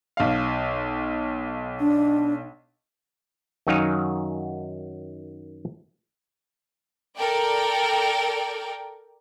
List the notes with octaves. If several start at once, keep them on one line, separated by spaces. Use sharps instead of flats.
B1 F5
D4
F#2 D#3 F#3 D#4 F5 G#5
A4 A#4 D5 G5